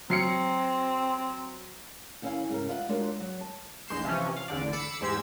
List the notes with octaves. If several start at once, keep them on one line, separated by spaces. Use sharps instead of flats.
F#3 C4 C7 C#7
D#3 C#4 E4 E5 F5 G#5
G#2 C#3 C#4 A#4
F4 B4 D#5 E5 F#5
G#3 D4 F4 F#4 A#4 C#5
F#3 C#5
A5
A#1 E2 G#3 G6 C7 E7
C3 E3 F3 C#4
F5
A1 E2 D3 D5
B5 D6 E6 C7 C#7
E2 G#2 G#3 G4 E6 G#6